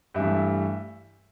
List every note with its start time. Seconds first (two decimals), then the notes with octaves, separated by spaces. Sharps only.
0.14 G2 E3 A3 E5